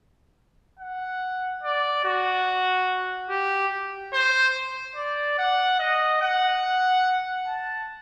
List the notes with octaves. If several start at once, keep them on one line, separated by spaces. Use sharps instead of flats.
F#5
D5
F#4
G4
C5
D5
F#5
D#5
F#5
A5